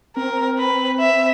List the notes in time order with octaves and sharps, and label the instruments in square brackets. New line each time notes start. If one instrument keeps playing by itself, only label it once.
[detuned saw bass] C4 [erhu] A#4
[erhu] B4
E5